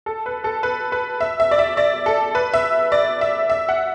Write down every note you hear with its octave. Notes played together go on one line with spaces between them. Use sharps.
A4
B4
A4
B4
B4
E5
E5
D5
E5
D5
A4
B4
E5
D5
E5
E5
F#5